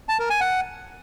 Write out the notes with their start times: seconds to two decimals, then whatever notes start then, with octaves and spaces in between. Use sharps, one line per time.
0.09 A5
0.19 A#4
0.30 G#5
0.41 F#5